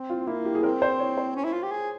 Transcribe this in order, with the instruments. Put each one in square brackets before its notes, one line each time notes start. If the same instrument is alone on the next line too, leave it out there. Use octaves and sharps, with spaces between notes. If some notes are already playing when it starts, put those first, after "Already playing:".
Already playing: [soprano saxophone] C4
[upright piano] F4
[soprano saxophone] A#3 [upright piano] E4
[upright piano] G4
G#4
[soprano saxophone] C4 [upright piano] A#4
[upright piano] C5
C#5
C5
[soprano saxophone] C#4
E4
F4
G4
G#4